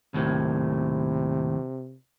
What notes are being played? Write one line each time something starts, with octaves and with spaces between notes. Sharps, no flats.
D#2 A2 C3